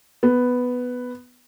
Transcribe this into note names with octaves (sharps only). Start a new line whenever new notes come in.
B3